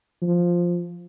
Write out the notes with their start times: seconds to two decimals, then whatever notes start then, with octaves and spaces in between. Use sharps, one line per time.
0.22 F3